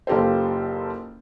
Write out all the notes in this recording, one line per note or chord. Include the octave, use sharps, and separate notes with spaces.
F#1 F4 G4 A4 C5